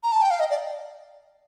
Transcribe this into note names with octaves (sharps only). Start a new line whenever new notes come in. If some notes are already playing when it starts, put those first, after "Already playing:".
A#5
A5
G5
F5
D#5
D5